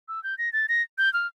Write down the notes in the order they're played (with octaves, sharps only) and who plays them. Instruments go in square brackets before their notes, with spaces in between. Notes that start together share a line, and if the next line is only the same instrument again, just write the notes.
[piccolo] E6
G6
A#6
A6
A#6
G6
F6